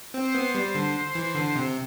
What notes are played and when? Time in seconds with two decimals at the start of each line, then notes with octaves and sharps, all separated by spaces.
0.14 C4 C5
0.35 B3
0.55 G3
0.75 D3
1.15 E3
1.35 D3
1.55 C3